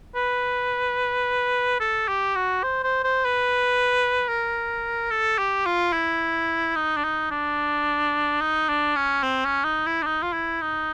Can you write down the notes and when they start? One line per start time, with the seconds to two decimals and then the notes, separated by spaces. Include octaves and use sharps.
0.16 B4
1.80 A4
2.08 G4
2.35 F#4
2.63 C5
2.84 C5
3.04 C5
3.25 B4
4.28 A#4
5.11 A4
5.39 G4
5.66 F4
5.93 E4
6.76 D#4
6.97 D4
7.04 D#4
7.31 D4
8.41 D#4
8.69 D4
8.96 C#4
9.23 C4
9.45 C#4
9.64 D#4
9.86 E4
10.03 D4
10.07 D#4
10.23 F4
10.33 E4
10.62 D#4